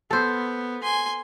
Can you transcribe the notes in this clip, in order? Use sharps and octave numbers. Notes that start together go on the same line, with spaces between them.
B3 A4 C5
G#5 C6